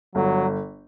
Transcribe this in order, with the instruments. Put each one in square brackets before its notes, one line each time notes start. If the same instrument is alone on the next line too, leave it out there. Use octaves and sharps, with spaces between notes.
[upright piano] G1 [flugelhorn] F#3